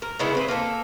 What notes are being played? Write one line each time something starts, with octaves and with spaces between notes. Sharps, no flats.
A#4
C#3 G#3 B3 E4
C4 B4
A#3 A4